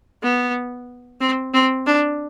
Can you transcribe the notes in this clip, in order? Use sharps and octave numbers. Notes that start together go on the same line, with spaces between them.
B3
C4
C4
D4